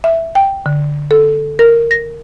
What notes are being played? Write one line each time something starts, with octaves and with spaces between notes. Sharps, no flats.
E5
G5
D3
A4
A#4
A#6